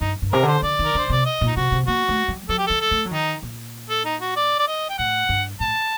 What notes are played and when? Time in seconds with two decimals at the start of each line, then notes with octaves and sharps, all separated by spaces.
0.01 G2 D#4
0.22 G2
0.32 C3 A#4
0.43 D3
0.48 C5
0.62 D3 D5
0.79 D#3
0.84 A#4
0.95 D3 C5
1.10 C3 D5
1.25 D#5
1.41 A#2
1.47 D#4
1.56 C3 F#4
1.72 C3
1.87 A#3 F#4
2.09 A3
2.28 G3
2.49 F#3 A4
2.58 G4
2.67 G3 A4
2.81 A4
2.91 A3
3.05 F#3
3.11 D#3 D#4
3.42 A#2
3.90 A4
4.05 D#4
4.21 F#4
4.36 D5
4.59 D5
4.67 D#5
4.89 G5
4.98 A2 F#5
5.29 G2
5.60 A2 A5